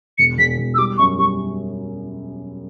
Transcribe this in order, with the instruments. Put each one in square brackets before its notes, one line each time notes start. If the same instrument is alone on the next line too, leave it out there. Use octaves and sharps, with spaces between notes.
[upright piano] E1 [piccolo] C#7
[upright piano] E1 [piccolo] B6
[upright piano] E1
[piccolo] E6
[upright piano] G3 [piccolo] D6
[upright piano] F#2 [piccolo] C#6
[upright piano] G3 [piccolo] C#6